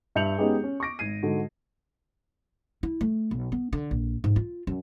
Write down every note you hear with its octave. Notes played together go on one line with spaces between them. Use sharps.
G2 E5 G6 C#7 F7 F#7
G#3 B3 C#4 D#4 G4 G#4
C#4
C#6 D6 A#6 D7
G#1 G#6 C7 D#7
G#2 D3 F#4
E4
A3
B1
B3
D3
A#1
G#2
F4
F#2